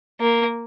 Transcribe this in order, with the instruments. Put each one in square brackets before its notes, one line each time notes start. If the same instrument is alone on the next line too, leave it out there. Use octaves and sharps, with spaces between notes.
[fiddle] A#3